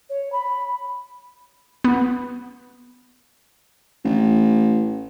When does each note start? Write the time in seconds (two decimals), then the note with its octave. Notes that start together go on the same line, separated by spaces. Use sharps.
0.10 C#5
0.32 B5
1.84 B3
4.04 A1